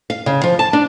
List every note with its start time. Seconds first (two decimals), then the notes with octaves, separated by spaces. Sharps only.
0.10 F5
0.26 C#3
0.44 F3
0.59 A5
0.73 D4